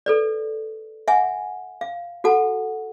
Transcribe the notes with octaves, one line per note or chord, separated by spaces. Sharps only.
A4 B4 D5
E5 F#5 G#5
F5
F#4 A4 F#5 A5